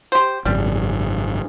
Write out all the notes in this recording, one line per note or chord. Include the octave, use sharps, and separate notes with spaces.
G4 C5
G#1 F#2 C#3 G3